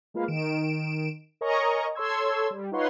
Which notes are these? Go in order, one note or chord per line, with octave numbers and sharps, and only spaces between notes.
G#3 A#3 F4 B4 F5
D#3 D7 E7
A#4 C#5 D#5 G#5 A#5 C#6
A4 C#5 C6 E6 G#6
G3
D#4 F4 B4 C#5 F#5 C6